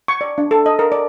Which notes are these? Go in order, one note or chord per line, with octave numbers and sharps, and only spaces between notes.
C#6
D5
D4
A4
D#5
A#4
D5